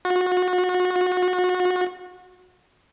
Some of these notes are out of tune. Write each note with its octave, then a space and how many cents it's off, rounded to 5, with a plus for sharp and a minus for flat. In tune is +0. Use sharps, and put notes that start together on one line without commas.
F#4 -30